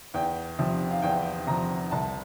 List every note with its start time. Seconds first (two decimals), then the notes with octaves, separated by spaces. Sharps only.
0.14 E2 G5
0.59 C3 F3
0.91 F5
1.02 E2 G5
1.47 C3 F3 A#5
1.91 C2 A5